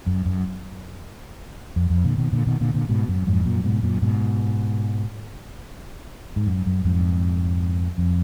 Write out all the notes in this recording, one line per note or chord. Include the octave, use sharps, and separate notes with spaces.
F#2
F#2
F2
F2
A#2 D3
B2 D#3
A#2 D3
B2 D#3
A#2 D3
A#2 D3
G#2 B2
F#2
F2 G#2
F#2 A#2
G#2 B2
F#2 A#2
G#2 B2
G#2
F#2
F#2
F2 G#2
F2